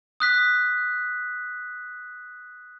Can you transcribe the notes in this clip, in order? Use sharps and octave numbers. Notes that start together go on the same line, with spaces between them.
D#6 F#6 B6